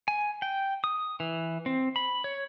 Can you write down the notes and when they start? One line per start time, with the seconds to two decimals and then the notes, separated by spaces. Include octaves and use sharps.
0.08 G#5
0.42 G5
0.84 D#6
1.20 E3
1.66 C4
1.96 B5
2.24 C#5